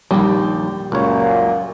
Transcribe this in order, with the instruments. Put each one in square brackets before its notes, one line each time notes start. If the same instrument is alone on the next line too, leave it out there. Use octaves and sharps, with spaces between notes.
[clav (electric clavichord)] A#1 D#2 [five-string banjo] G3
[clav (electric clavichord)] C#2 C#5 [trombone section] F#2 A#2